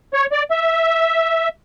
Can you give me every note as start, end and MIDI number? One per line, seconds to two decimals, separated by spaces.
0.13 0.26 73
0.32 0.43 74
0.51 1.49 76